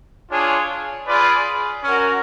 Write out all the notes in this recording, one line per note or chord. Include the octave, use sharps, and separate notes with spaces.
D4 F4 G#4 C#5
F4 G#4 B4 D5
C#4 F#4 A#4